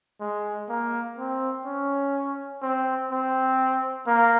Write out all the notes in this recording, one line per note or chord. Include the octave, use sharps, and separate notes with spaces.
G#3
A#3
C4
C#4
C4
C4
A#3